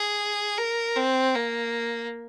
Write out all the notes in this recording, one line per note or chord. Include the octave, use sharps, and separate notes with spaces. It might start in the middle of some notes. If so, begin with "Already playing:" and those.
Already playing: G#4
A#4
C4
A#3